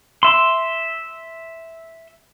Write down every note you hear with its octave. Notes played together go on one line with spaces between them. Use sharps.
E5 C6